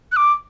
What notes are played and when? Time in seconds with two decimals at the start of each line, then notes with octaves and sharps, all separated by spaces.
0.12 F#6
0.17 D6